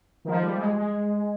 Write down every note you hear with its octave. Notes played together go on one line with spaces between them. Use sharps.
D#3
F3
G3
G#3
G#3